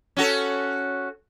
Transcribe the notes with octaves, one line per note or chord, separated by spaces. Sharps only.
C#4 F#4 A4